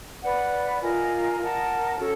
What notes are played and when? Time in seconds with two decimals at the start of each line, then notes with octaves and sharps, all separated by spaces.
0.23 B4 D5 F#5
0.82 F4 A#4 D#5 G#5
1.40 A#4 D#5 F#5 A5
1.99 C#4 F#4 A4